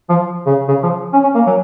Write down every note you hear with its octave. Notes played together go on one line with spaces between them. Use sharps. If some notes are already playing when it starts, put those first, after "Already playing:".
F3
C#3
C#3
F3
C#4
C#4
A#3
F#3